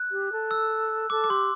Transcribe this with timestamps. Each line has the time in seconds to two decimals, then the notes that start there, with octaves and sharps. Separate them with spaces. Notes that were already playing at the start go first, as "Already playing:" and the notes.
Already playing: F#6
0.11 G4
0.32 A4
0.51 E6
1.10 A4 D6
1.24 D6
1.30 G4 C6